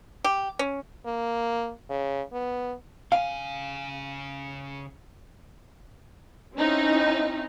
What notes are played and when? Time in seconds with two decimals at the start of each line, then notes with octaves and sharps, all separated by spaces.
0.24 G4
0.59 C#4
1.06 A#3
1.90 C#3
2.33 B3
3.12 C#3 F5 G#5
6.56 C4 C#4 D#4 E4